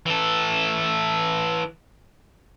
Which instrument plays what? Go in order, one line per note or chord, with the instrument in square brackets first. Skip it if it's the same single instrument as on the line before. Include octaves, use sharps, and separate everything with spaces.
[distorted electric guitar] E3 A4